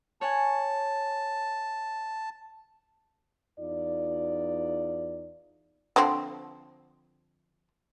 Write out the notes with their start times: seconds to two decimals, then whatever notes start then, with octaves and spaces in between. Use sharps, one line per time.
0.21 C#5 F#5 G#5 A5
3.59 E2 D#4 F4 D5
5.96 D3 F3 C4